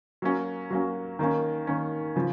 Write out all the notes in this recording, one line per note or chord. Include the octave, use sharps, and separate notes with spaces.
F#3 A#3 C#4
F#3 A#3 C#4
D#3 A#3 C#4
D#3 A#3 C#4
C#3 F3